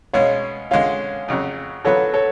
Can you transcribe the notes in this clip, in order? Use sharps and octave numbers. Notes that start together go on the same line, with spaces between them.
B2 G#3 C#4 C#5 F5
D3 G#3 C#4 F4 C#5 F5
F2 C#3 F#3
D3 F#3 B3 F4 A4 B4 C#5
A4 C#5